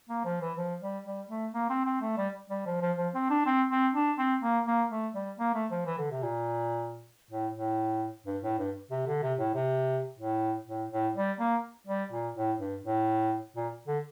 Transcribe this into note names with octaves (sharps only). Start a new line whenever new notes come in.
A#3
F3
E3
F3
G3
G3
A3
A#3
C4
C4
A3
G3
G3
F3
F3
F3
C4
D4
C4
C4
D4
C4
A#3
A#3
A3
G3
A#3
A3
F3
E3
D3
C3
A#2
A2
A2
G2
A2
G2
C3
D3
C3
A2
C3
A2
A2
A2
G3
A#3
G3
A#2
A2
G2
A2
A#2
D3